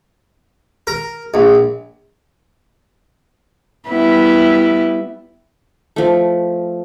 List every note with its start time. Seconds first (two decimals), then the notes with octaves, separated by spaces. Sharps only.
0.87 A#4
1.34 A#1
3.88 G3 B3 E4
5.96 F3 A3